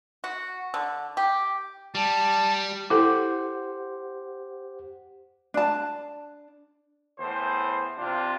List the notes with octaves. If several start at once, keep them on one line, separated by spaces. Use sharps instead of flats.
F#4
D3
G4
G3 A5
E4 G4 A4 C5 F#5
D4 A5
E2 A2 C5
C3 C4 D4 F4